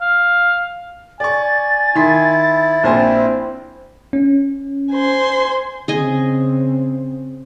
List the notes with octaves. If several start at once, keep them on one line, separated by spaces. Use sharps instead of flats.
F5
D5 G#5 C#6 A6
D#3 E4 C6 B6
A#1 C4 C5 G#5
C#4
C5 G#5 C6
C#3 C4 G#4 D#5 G#5